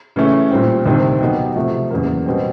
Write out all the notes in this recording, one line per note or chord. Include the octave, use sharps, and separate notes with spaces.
C#3 E3 A3 C#4
A#2 G3 C4
D2 C3 D#3 G3 C4
B2 F#3 B3 D#4 G4
C3 F3 A3
E2 C#3 F#3 A#3
B2 G3 C4